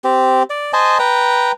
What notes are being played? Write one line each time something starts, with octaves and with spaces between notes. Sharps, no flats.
C4 G4
D5
C5 D#5 G#5 A5
B4 G5 A#5